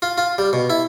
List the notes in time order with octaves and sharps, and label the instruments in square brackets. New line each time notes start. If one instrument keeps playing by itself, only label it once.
[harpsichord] F4
F4
G3
B2
E4